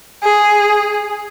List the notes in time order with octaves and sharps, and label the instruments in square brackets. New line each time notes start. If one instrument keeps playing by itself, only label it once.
[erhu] G#4